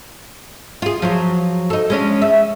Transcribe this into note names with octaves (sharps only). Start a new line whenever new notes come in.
F4 G#4
F3 F#3 F4
D#4 A4
G#3 C#4 D4
E5